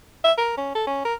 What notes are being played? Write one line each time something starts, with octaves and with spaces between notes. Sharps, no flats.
E5
A#4
C#4
A4
C#4
A#4